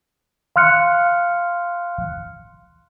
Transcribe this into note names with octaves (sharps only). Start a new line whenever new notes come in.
F5 C6 F6 F#6 C#7